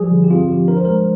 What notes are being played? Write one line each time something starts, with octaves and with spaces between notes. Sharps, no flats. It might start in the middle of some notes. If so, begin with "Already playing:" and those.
Already playing: F3 G3 G#4
D3
G4
C4 F4
F3 G4
D4 A#4
C5
G#3 A#4